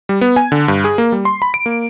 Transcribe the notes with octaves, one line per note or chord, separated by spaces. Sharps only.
G3
B3
G#5
D3
G2
G#4
A#3
G3
C6
B5
D7
A#3